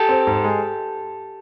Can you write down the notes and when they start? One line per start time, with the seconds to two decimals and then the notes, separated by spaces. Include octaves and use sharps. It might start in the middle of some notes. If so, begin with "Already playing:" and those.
Already playing: G4 A4
0.09 C4
0.27 G#2
0.44 G#3